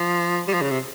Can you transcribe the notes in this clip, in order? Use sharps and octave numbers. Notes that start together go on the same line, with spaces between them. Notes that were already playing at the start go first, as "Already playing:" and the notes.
Already playing: F3
G3
F3
C#3
C3